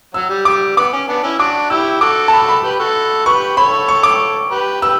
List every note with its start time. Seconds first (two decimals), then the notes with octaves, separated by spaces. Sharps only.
0.14 F#3 E6
0.30 G3
0.45 G3 D6
0.77 B3 D6
0.93 C#4
1.08 B3 D4
1.23 C#4 E4
1.39 D4 F#4 D6
1.70 E4 G4 E6
2.01 F#4 A4 D6
2.28 A5
2.33 B5
2.49 B5
2.63 G4 B4
2.80 F#4 A4
3.26 G4 B4 C#6
3.57 A4 C#5 B5
3.88 C#6
4.03 D6
4.50 G4 B4
4.82 G4 B4 E6